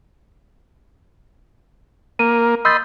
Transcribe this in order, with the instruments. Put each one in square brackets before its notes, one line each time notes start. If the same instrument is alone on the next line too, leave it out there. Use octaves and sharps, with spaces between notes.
[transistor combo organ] A#3 [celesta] D#7
[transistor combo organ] D#5 B5 C6 [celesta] E6 G6 A6